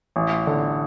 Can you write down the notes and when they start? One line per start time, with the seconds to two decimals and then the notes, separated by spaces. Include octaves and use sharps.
0.16 A1
0.47 D3